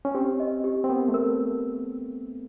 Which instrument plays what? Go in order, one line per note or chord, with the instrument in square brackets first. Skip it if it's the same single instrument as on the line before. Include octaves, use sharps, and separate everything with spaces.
[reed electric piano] C#4
[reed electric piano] C4 [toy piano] G4
[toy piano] D#5
G4
[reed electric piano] C4
[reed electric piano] B3 [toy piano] A#4
[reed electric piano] A3
[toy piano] A#4